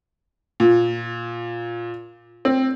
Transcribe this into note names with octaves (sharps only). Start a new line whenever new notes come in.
A#2
C4